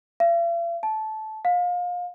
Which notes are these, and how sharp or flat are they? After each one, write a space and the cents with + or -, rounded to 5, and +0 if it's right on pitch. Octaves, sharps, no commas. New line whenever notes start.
F5 -45
A5 -15
F5 +30